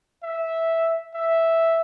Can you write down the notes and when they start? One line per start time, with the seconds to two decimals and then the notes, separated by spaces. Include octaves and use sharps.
0.23 E5
1.14 E5